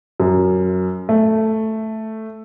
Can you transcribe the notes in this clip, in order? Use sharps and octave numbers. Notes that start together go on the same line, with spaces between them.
F#2
A3